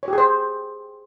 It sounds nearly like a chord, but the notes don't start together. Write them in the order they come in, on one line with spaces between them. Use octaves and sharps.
C#5 G4 G#4 C5